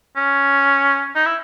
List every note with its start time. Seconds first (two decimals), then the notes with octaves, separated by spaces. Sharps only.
0.17 C#4
1.15 D#4
1.26 E4